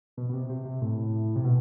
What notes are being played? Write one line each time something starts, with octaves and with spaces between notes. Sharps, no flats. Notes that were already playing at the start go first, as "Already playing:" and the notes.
B2
B2
C3
C3
C3
A2
C3
B2